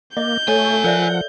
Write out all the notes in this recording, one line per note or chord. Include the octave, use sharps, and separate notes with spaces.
A#3 D#5 G6
A3 F4 A4 C#5 G#5
F3 A#4 D5 E5 F#5